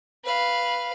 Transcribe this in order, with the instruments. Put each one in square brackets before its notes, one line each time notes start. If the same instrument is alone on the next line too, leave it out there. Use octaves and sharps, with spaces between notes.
[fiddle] B4 F5